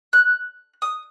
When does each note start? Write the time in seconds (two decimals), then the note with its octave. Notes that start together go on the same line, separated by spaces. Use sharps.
0.13 F#6
0.82 D#6